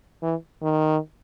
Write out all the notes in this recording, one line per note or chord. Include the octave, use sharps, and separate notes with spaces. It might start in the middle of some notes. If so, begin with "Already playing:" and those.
E3
D#3